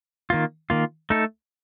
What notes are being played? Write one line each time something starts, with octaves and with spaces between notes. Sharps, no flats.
D#3 A#3 F4
D#3 A#3 F4
A3 D#4 A4